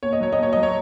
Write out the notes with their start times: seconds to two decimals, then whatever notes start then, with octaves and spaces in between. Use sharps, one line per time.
0.03 D#2 C#5
0.13 D#5
0.20 F#3 C#5
0.32 D#5
0.38 D#2 C#5
0.53 F#3 D#5
0.63 C#5